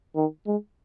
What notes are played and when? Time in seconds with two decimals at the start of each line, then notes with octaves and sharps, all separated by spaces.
0.16 D#3
0.47 G#3